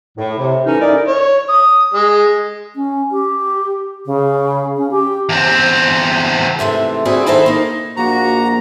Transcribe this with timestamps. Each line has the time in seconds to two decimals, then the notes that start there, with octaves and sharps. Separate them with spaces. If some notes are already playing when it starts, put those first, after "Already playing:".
0.17 A2
0.39 C3
0.66 E3 A3 C#4 D#4
0.81 D#4 E4 A#4 D5
1.08 C#5
1.49 D#6
1.94 G#3
2.76 C#4
3.12 G4
4.06 C#3
4.77 C#4
4.91 G4
5.29 E2 C4
6.59 G#2 C3 E3 A3
7.05 D2 G3 C4 E4 F#4 G#4
7.27 D#3 D#4 E4 A4 C5
7.46 A#3 D#4
7.97 A#1 A#3 F#4 A#5